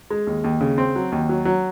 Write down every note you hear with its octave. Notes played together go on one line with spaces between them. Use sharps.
G#3
D#2
D#2
C#3
C4
F#3
D#2
F#3
F#3